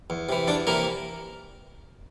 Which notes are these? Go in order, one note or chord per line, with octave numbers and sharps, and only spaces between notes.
E2
C3 E3
E2 D4 D5
C3 E3 A#3 A#4